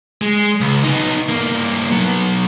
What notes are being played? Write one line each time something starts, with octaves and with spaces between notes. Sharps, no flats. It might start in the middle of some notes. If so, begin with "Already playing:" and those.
G#3
C#2
B3 D#4
G2 A#3
F#3 B3